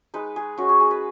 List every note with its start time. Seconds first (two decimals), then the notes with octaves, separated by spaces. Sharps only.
0.14 G#3 D#4 B4
0.36 G#4
0.58 G#3 C#4 F#4
0.69 G#4
0.80 G#4
0.91 B4